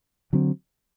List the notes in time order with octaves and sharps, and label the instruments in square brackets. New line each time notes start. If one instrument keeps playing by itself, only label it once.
[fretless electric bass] D3 F#3 C4